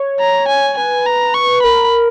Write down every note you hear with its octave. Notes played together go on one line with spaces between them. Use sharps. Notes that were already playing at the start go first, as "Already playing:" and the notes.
Already playing: C#5
A#5
G#5
B4 G#5
A#5
C#6
A#4 B5